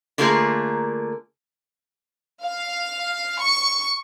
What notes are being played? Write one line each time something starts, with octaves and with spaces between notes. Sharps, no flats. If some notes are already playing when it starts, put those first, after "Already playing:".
D3 A3 A#3 F4 G#4 A#4
F5
C#6